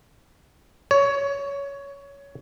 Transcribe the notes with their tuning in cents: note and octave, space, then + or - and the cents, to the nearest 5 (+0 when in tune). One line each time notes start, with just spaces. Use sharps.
C#5 +15